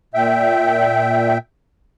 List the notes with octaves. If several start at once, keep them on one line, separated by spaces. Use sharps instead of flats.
A#2 E5 G5